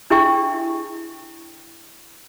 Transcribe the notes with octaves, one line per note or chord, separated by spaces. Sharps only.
D4 E4 G#4 E5 G5 C#6